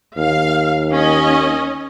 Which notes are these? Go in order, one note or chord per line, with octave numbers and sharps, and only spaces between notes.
D#2 F5
C#4 D#5